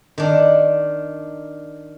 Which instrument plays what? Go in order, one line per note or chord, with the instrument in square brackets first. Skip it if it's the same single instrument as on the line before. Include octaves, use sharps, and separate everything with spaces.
[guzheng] D#3 D4